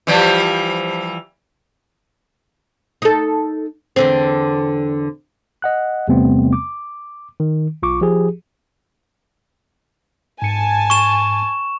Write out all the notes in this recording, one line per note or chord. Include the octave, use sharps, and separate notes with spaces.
E3 F3 G3
D#4 A4
E2 D3 C4
D#5 F#5 F#6
E2 C3 G3 A3 B3 C4
D6
D#3
B1 F4 C#6 D6
F3 G4 G#4
G#2 G#5 A5 C#7
C#6 E7